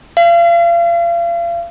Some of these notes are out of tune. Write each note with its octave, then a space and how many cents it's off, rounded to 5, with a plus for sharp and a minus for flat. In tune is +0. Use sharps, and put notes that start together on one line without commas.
F5 -35